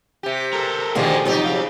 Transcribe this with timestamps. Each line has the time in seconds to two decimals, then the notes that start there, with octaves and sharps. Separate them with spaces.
0.23 C3 G4
0.53 A4 A#4
0.95 B2 D3 D#3 F3 A#3 G4 G#4 C5
1.26 F2 C3 F3 F#3 D#4 G4
1.45 G#4 F5